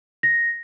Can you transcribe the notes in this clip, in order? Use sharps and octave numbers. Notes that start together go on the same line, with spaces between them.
A#6